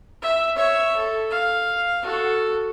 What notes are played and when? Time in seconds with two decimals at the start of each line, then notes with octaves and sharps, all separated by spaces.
0.22 E5
0.56 C#5 E5
0.96 A4
1.31 F5
2.03 F#4 A4